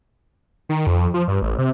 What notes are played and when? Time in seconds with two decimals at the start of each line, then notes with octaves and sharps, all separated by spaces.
0.69 D#3
0.87 F2
1.14 F3
1.28 G2
1.42 A1
1.59 C3